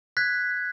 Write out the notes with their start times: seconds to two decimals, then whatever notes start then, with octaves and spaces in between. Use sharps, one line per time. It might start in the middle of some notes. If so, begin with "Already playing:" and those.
0.17 F#6 G#6 B6